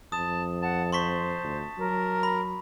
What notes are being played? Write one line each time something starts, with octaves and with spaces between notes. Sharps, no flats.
F2 A5 D#6
F#5 A5
C5 A5 C6 C#6 B6
D2
F#3 A#4
B5